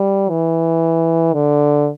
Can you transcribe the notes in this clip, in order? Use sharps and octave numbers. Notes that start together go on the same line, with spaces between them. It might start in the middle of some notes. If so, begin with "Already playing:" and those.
Already playing: G3
E3
D3